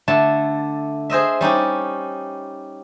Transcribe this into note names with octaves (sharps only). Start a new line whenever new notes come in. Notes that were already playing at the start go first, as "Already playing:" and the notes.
D3 A3 E4 A5
G#4 C5 D#5 E5
G3 C#4 D#4 G4